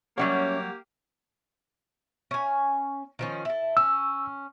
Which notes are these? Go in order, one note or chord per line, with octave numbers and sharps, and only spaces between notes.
F#3 G3 A#3 C#4 G4 C#5 E5 F#5
C#4 G#5
D#3 F3 C#4
E4 A4
C#4 E6